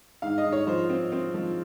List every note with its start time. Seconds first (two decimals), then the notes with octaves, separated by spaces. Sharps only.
0.22 G#2 F5
0.38 D#5
0.44 G#2
0.52 C#5
0.67 F3 C5
0.90 C4
1.12 C4
1.34 F3